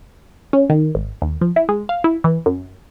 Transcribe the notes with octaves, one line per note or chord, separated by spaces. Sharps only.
C#4
D#3
G#1
D#2
F3
E4
G#3
F5
E4
E3
F#2